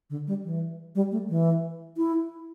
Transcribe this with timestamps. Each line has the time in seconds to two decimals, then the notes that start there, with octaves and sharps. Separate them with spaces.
0.10 D3
0.27 G3
0.44 E3
0.95 G3
1.11 A3
1.29 E3
1.97 E4